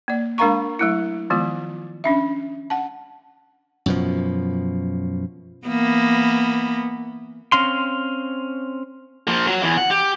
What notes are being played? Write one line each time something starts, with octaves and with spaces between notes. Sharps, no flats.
A#3 D5
G#3 D4 A#4 F5 A#5 C#6
F#3 A3 E4
D#3 F3 G#3 B3 F4
C#4 D4 E5
F#5 A5
F#2 B2 F3
E3 A#3 B3
C4 C#4 F5 C6
F3 A#3
F#3
E2 E3
F#5
G4